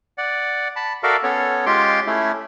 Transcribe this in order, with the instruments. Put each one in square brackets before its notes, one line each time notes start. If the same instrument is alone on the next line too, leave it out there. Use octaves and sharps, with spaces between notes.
[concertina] D5 F#5
A5 B5
F#4 A4 A#4 D5 E5 F5
B3 C#4 A4 C#5
G#3 C#4 F4 G4 C6 D6
A3 C#4 E4